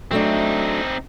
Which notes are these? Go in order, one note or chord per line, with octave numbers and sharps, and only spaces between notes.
F#3 A3 C4 D4 D#4